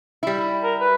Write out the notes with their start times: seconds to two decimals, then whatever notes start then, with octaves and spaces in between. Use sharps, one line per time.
0.23 G3 E4
0.63 A#4
0.80 B4